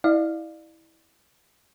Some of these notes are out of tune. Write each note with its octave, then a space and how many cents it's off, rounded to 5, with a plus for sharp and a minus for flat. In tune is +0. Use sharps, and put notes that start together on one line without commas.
E4 -20 D5 +35 F5 +0